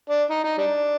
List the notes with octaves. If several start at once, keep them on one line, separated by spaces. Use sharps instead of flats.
D4
D#4
D#4
G3 D4